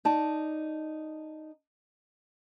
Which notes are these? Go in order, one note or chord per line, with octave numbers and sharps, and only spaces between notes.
D#4 D5 A5